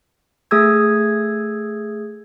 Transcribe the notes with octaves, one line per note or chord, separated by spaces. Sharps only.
A3 G#4 D#6 E6 G#6